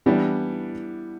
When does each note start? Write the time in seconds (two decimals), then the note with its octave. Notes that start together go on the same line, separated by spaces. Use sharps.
0.06 E3 G3 B3 D4